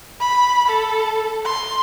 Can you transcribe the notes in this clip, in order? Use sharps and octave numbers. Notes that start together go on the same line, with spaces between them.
B5
A4
C6